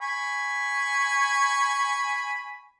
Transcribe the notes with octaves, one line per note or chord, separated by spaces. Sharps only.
G#5 B5 C#6